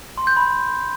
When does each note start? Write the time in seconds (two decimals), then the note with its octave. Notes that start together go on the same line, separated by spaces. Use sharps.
0.18 C6
0.27 G6
0.37 B5